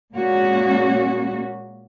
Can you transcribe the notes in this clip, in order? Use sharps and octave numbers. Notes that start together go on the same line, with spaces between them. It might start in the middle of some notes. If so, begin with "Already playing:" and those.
A#2 G#3 A#3 C#4 F#4